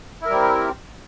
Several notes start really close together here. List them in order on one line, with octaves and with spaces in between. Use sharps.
E4 A#4 G3 C4